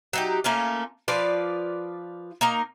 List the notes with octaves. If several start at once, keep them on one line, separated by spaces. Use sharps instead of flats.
F#3 D#4 G4
A3 A#3 C#4 F4
F3 F4 B4 D5
A#3 D#4 A#4